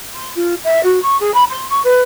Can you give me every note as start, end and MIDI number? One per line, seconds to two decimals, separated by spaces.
0.15 0.30 84
0.36 0.55 65
0.64 0.80 76
0.84 1.02 66
1.02 1.17 85
1.20 1.33 68
1.34 1.44 83
1.50 1.65 84
1.70 1.80 85
1.84 2.02 71